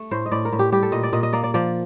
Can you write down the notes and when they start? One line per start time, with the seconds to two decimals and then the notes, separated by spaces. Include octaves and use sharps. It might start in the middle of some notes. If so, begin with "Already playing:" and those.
Already playing: A3
0.11 A2 C5
0.26 D#5
0.31 A2 D5
0.45 A#4
0.52 A2
0.59 G4
0.72 G3 G4
0.83 A4
0.92 A#2 D#5
1.03 D5
1.13 A#2 D#5
1.23 D#5
1.33 A#3 D5
1.43 D5
1.54 F3 D5